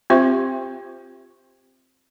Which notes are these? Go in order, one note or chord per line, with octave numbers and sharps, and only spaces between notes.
C4 F4 G4 C5 E5 C#6